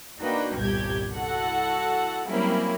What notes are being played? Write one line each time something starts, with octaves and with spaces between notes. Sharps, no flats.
A#3 D4 D#4 F#4 B4 G5
G1 C2 A#2 G4 G6 G#6
E4 F#4 A4 F#5
F#3 G3 A#3 C4 C#4 E4